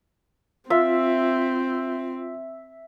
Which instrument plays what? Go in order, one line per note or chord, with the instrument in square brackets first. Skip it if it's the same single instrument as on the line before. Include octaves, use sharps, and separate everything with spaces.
[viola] C4 [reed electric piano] F4 [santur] E5